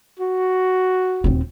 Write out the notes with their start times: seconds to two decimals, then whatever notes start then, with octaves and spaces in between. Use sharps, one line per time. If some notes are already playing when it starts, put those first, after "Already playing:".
0.20 F#4
1.24 D#1 C4